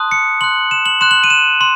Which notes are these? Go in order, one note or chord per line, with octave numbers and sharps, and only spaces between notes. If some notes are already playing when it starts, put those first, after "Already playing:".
Already playing: A5 C6 D#6 F#6
C#7
C6 F#6 F#7
E7
F#7
C6 F#6 E7
F#7
D#7
E7
C6